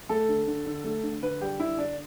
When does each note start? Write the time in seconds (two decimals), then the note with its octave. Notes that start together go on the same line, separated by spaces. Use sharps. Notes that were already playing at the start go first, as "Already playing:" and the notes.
0.09 A3 A4
0.29 D3
0.47 D3
0.66 D3
0.84 A3
1.03 D3
1.23 D3 B4
1.41 G3 G4
1.60 D3 E4
1.78 D3 D4